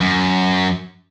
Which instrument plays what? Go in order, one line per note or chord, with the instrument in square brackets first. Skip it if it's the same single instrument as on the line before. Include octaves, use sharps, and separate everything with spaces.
[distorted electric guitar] F#2